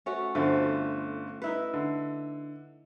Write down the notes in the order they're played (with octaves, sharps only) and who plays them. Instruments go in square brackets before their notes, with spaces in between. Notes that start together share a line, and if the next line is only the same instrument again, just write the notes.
[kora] A3 C#4 F#4
[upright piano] G1 D3 [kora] F3 A3
[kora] D#4 E4 B4
[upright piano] D3